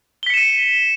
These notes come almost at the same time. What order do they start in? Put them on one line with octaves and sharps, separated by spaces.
G7 B6 C#7 E7 D#7